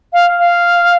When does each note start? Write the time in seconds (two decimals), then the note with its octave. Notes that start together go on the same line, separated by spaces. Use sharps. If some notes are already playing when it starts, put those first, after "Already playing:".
0.13 F5
0.39 F5